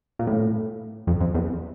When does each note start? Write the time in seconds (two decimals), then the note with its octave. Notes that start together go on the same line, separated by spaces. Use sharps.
0.19 A#2
0.27 A2
1.07 F2
1.20 F2
1.34 E2